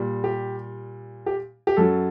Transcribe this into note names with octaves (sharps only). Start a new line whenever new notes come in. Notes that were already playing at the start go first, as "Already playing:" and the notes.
Already playing: A#2 G3
G4
G4
G4
F#2 F#3 A4